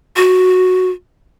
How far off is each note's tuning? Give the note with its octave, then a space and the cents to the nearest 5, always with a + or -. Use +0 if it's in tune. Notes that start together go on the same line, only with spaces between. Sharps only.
F#4 -5